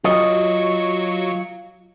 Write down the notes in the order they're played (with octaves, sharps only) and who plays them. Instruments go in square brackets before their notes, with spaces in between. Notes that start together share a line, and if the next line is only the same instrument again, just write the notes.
[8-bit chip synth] F#3 C#6 [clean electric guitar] F4 D#5